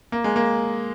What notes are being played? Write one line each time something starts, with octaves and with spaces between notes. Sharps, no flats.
A#3
G#3
A#3